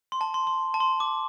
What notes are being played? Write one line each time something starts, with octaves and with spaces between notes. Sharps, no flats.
C6
A5
C6
C6
A5
C6
D6